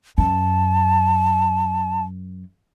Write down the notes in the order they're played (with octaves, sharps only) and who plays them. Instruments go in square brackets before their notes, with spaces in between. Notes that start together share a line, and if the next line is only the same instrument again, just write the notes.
[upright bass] F#2 [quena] A5